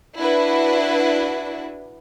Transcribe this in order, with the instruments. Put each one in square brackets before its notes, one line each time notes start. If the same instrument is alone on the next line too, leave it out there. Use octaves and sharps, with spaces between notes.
[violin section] D4 E4 F#4 B4